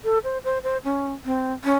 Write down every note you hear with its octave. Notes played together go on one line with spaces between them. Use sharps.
A4
C5
C5
C5
C#4
C4
C#4